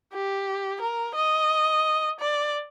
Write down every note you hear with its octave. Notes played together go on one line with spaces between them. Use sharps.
G4
A#4
D#5
D5